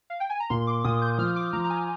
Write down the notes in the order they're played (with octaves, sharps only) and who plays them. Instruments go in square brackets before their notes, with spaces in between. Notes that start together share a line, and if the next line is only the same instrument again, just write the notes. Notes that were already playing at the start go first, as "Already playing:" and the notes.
[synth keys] F5
G5
G#5
A#5
[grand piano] A#2 [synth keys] C6
[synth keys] D6
[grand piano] A#2 [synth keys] D#6
[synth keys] G6
[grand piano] F3 [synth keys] F6
[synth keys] D6
[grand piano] F3 [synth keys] A#5
[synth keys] A#5
G#5